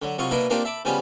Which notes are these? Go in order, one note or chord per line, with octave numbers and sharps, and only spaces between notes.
D3 F#3
C2 F#3 F4 D#5 C#6 D#6
B2 A#3 D4 E4 D#5 D#6
A#3 C4 D4 D#4 F4 G4
E5 A5 B5 D6
C#3 F3 G3 B3 C#4